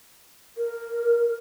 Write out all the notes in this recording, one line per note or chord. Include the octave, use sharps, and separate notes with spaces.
A#4